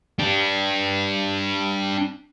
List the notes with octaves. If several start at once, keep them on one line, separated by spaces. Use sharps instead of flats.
D4 G4